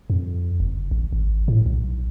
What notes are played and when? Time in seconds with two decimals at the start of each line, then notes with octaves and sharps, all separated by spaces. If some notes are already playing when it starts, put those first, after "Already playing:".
0.10 F2
0.60 F#1
0.91 A1
1.13 G#1
1.48 A2
1.66 B1